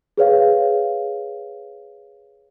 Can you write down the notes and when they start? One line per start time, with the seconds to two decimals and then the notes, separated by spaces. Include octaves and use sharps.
0.17 G#4 B4 C#5 F5